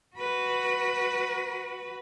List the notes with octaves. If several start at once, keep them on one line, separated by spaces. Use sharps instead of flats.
F#4 B4